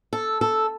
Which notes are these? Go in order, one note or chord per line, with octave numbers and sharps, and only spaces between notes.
A4
A4